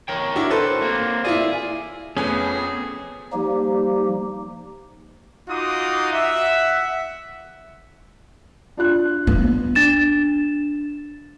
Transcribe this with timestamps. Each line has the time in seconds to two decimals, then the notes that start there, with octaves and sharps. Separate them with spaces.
0.08 A#4 C#5 G5
0.36 D4 E4 F#4
0.50 A4 B4 C5
0.82 A#3 C4
1.25 E4 F4 G#4 D5
2.17 F2 A3 B3 C#4 G#4 G#5
3.33 F3 G3 A#3 D#4 G4
5.49 D#4 F4 F#4 C6 D6 D#6
6.13 E5 F#5
8.77 D4 F4 F#6
9.27 B3
9.75 D4 A6 E7